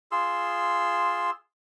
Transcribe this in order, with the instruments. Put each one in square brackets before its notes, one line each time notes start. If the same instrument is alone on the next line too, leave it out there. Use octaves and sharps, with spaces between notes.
[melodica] F4 G#4 C6 E6